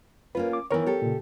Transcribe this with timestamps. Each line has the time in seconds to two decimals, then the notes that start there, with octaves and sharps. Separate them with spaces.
0.35 A#3 C#4 F4 B4
0.53 D6
0.71 D#3 E3 B3 A#4 C#5
0.86 G4 A4
1.02 A#2 C#3